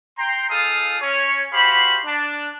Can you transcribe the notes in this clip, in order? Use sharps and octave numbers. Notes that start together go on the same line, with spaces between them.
G5 A#5 C6
D#4 F4 G#4 A4 F5 D#6
C#4 C#5
F#4 G4 C5 F5 B5
D4